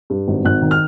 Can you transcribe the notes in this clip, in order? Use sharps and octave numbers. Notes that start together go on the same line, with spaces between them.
G2
G#1
G#1 F#6
D#3
F6